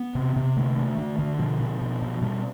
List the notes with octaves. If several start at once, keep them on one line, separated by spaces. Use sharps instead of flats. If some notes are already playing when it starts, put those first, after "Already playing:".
Already playing: B3
C3
C3
D3 A3
D3
D3
D3
B2 F3
B2
B2
B2
B2 G3